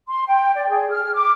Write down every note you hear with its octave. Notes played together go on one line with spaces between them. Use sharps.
C6
G5
D5
G#4
F6
D6